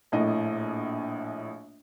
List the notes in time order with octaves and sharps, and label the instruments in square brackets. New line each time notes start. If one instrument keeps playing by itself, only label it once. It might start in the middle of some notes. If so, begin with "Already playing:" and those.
[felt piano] A#1 A2 D#5